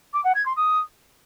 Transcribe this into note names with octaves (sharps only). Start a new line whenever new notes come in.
D6
F#5
G#6
C6
D#6